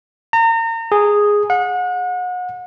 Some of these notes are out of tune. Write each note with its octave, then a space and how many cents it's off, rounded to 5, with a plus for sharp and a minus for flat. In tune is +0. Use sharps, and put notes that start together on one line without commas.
A#5 -35
G#4 -5
F#5 -35